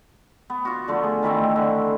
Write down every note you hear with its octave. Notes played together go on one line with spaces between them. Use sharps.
B3
F4 F#4
D3 F3 A3
G#4
D#3 E3 A3 C4
D3